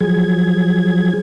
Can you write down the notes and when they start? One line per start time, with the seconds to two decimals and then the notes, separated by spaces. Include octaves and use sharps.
0.01 F3 F#3 G#4 G#6